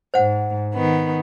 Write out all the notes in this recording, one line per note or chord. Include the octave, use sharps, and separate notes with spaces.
G#2 C5 F#5
D#3 B3